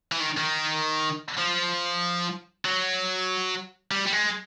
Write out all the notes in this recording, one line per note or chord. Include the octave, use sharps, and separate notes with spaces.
E3
D#3
D#3
F3
F#3
G3
G3
G#3